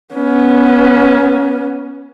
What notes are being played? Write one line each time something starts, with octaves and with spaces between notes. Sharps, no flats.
B3 C#4